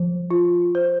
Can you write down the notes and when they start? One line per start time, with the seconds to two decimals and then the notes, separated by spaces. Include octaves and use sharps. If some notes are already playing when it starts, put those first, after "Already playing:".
Already playing: F3
0.30 F4
0.75 C5